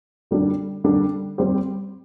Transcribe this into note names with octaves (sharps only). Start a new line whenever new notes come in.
D3 G3 D4
D3 G3 D4
G3 C4 G4 C5